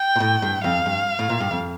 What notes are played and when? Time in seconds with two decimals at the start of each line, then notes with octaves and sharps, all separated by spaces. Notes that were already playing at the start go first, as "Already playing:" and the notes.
Already playing: G5
0.16 A#2
0.20 A2
0.42 G2
0.64 F2 F5
0.86 G2
1.19 A2
1.29 A#2
1.40 G2
1.51 F2